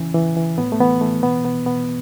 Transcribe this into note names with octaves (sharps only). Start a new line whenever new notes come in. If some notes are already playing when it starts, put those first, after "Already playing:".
Already playing: C#3 E3 C#4
E3
E3
A2 B3
A3
E3 B3
E3 A3
B2 B3
B2 B3
B2 B3